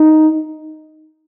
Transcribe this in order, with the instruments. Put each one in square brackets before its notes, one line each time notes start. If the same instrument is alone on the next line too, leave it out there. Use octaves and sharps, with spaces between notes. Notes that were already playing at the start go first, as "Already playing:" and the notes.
Already playing: [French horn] D#4